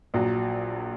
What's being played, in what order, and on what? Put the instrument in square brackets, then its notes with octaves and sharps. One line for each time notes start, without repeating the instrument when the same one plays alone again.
[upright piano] A#1 A#2 F#3